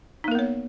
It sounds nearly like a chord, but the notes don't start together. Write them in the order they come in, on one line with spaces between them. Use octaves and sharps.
D#4 A#3 A#4 B3 C#5